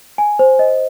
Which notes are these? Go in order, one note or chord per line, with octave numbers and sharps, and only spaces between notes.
G#5
C5
D#5